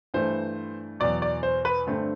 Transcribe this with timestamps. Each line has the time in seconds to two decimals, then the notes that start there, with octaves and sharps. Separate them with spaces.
0.14 G2 E3 A3 C5
1.00 E2 B2 F#3 D5
1.22 D5
1.43 C5
1.65 B4
1.87 G2 D3 A3 C4